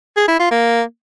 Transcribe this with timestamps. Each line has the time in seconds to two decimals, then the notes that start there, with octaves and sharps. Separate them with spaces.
0.16 G#4
0.28 E4
0.39 F4
0.51 A#3